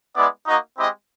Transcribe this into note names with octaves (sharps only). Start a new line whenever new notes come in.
G#3 B3 E4 D5
A#3 D#4 F#4 D#5
G#3 C4 E4 G4 D#5